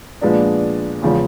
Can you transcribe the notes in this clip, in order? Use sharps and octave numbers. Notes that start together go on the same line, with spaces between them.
A#2 F3 G#3 B3 D4
E2 C#3 F3 G#3 C#4